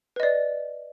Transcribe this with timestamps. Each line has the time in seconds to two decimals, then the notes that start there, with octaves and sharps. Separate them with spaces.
0.16 B4
0.20 D#5
0.23 D5